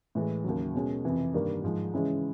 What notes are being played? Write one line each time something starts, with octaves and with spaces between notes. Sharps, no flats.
A2 E3 G#3
D#2 C#3 F#3
B2 G#3 C#4
F2 C3 E3
G2 D#3 G3 A#3
G#2 F3 G#3
C#3 E3 G#3 C#4 E4